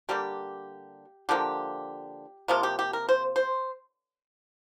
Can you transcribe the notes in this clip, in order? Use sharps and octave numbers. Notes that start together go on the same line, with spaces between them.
D3 G3 A#3 G4
D3 F3 A#3 G4
C3 F3 A#3 F4
G4
G4
A#4
C5
C5